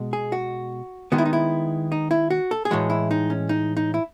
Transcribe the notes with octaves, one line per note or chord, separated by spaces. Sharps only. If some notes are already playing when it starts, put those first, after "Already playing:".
Already playing: B2 G#3
G#4
F#4
D#3 G#3 B3 F#4
E4
D#4
E4
D#4
E4
F#4
A4
G#4
A2 E3 G#3 F#4
E4
D#4
C#4
D#4
D#4
E4